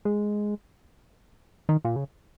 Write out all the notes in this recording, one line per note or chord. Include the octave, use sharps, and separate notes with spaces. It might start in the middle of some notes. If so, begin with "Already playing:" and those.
G#3
D#3
A#2
C#3